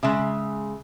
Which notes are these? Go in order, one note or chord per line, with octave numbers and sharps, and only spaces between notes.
C#3 G#3 E5